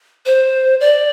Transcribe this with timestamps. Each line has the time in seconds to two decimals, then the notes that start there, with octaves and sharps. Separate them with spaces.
0.26 C5
0.80 D5